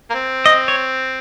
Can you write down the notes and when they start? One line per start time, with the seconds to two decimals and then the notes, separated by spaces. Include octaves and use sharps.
0.10 A#3
0.14 C4
0.46 D#5
0.68 C#5